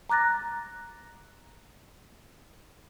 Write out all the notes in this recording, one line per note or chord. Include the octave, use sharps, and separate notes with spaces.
A#5 D6 F#6 A6 A#6